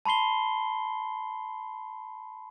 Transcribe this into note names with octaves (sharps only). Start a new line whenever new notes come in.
A5 B5 C6 C7 G7